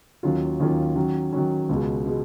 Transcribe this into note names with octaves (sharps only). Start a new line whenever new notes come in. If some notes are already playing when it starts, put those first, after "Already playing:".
D#2 D#3 F#3 C#4 F4
D#2 D#3 F#3 C#4 F4
D#3 F#3 C#4
D#3 F#3 C#4
C#2 B2 G#3
B2 G#3